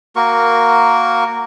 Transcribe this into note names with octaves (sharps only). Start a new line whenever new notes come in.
A#3 F#4 A#4 C#6